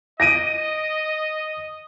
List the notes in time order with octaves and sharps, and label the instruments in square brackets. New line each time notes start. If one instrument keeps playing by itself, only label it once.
[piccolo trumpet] D#5 [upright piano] A#6 D7 D#7